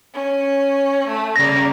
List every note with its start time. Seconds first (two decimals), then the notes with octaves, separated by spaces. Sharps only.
0.13 C#4
1.07 A3
1.36 C#3 G3 A#3 A#6